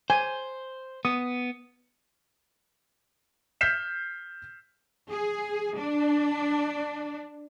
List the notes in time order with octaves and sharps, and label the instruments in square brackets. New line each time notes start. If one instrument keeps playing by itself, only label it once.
[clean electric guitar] C5 [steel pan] G#5
[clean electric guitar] B3 [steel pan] D#6
[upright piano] F6 G6 B6 C7 E7
[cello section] G#4
D4